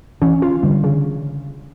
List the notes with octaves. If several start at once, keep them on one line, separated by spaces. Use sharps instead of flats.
E3 C#4
F4
D3 G3
C#3